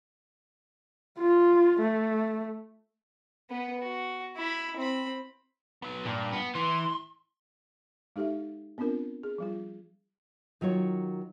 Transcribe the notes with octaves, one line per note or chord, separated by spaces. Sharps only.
F4
A3
B3 B4
F#4
E4 B5
C4 B5
F#3 B3
G2 A#2
B3
A2 E3 C6
G#3 D#4 G4 A4 E5
B3 C4 D4 F4 A#4
G#4
F3 G3 F4
D#3 F#3 F4 C#5